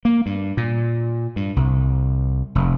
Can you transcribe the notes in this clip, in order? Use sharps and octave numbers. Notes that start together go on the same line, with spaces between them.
A#3
G2
A#2
G2
C2
F1